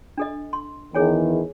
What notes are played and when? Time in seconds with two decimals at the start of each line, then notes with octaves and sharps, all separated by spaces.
0.18 D4 A4 D#5
0.53 C6
0.94 E2 D#3 E3 G#4 C#5 G#5